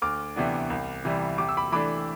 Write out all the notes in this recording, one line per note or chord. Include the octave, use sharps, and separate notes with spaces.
D2 D6 F6
C3 E3 B3 D4
C2
C3 E3 G3
C3 D6
E6
B5 D6
E3 A3 D4 B5 D6